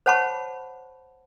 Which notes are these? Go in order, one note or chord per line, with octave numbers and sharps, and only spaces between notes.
C5 C#5 F#5 A5 B5 C#6